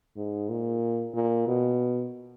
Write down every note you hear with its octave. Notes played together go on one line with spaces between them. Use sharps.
G#2
A#2
A#2
B2